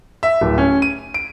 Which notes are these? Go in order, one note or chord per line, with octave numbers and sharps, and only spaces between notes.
E5
D1
C#4
D#7
D7